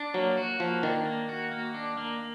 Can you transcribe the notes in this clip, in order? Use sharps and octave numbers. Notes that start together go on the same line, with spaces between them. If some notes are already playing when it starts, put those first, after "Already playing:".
Already playing: D4
F#3 A#3
F#4
F3 A#3
D#3 D4
A#3
F#4
A#3
D4
A#3